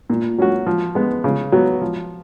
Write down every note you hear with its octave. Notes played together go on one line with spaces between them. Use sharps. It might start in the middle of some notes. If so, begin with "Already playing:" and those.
A#2
F#3 C#4 F#4
F3
G#3 B3
C#3
F#3 B3 F#4
F3